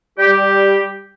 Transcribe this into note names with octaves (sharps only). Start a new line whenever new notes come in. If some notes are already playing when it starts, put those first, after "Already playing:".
G3 G4